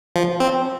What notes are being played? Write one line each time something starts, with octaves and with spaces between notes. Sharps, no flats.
F3
C4